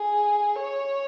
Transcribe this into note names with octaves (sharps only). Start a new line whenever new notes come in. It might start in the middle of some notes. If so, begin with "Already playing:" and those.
Already playing: G#4
C#5